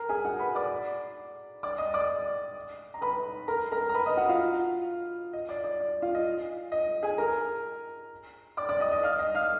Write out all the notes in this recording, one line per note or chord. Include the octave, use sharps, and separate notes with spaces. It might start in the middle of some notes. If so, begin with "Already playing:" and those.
Already playing: A#4 A#5
G#4 G#5
F#4 F#5
B4 B5
D5 D6
D5 D6
D#5 D#6
D5 D6
A#5
B4 B5
A#4 A#5
A#4 A#5
A#5
B4 B5
D#5 D#6
F#4 F#5
F4 F5
D#5
D5
D5
D5
F4 F5
D#5
D#5
G#4 G#5
A#4 A#5
D5 D6
D5 D6
D#5 D#6
D#5 D#6
F5 F6
D#5 D#6
F5 F6